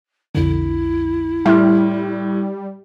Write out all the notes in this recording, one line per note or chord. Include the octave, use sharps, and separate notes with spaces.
B1 F2 D3 E4
A2 G3 E5 C6 F6